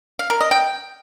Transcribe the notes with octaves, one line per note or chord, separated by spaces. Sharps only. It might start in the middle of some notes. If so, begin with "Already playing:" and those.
F5
A#4
D#5
G5